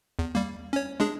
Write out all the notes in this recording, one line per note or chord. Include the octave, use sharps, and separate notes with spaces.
E2
G3 A#3
C#4 C#5
G#3 D4 G#4